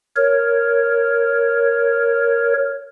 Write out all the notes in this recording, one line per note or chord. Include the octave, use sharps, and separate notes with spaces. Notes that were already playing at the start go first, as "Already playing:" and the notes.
A#4 C#5